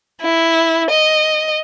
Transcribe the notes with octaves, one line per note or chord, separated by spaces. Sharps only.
E4
D#5